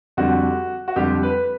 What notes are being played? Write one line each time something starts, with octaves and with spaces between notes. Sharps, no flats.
F2 D3 G3 F#4
F#4
F2 D3 G3 G4
B4